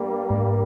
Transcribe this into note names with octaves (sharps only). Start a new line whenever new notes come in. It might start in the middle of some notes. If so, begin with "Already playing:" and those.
Already playing: G2 G3 A#3
G#2